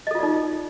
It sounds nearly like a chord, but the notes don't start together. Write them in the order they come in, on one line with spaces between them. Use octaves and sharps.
D#5 A4 F4 D5 D#4